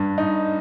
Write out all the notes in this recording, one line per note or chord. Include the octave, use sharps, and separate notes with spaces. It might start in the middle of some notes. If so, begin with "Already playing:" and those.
Already playing: G2
D#4